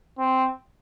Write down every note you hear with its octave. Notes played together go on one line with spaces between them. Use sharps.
C4